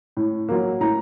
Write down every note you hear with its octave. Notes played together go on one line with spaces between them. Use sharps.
A2
F#3 A#3
A2 A#5